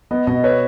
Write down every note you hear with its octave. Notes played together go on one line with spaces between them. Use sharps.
B3 D#5
B2 D#5
B4 C#5